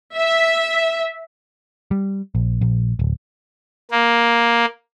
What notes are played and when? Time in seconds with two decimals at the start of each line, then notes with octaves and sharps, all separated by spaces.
0.15 E5
1.91 G3
2.35 A#1
2.61 A#1
2.99 D1
3.91 A#3